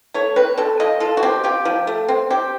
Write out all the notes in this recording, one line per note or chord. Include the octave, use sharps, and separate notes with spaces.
A3 C#5
C4 B4
C4 A4
F3 D#5
F4 A4
F#4
C4 G4
F4 G4
F3
A3
C4
C4 G4